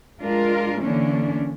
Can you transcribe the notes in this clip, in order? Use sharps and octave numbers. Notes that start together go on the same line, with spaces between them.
G#3 D4 F4 A#4
D3 E3 A#3 C#4 D4